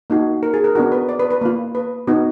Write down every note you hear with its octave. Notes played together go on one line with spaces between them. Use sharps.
A#3 D#4 F#4
A#4
G#4
A#4
B3 D4 F#4 A#4
B4
D5
B4
B4
A#3 F4
B4
B3 D#4 F#4